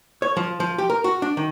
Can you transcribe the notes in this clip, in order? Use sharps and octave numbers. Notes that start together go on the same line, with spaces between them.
C#5
F3
F3
G4
A#4
F#4
D4
D#3